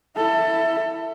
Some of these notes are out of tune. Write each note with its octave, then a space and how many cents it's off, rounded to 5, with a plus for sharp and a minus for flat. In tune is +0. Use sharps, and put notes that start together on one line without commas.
E4 +0 A4 +20